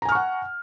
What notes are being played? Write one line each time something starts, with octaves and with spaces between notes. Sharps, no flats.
F#5 G#5 A#5 C#6 F6